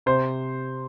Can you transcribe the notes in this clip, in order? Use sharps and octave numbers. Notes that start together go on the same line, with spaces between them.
C3 C5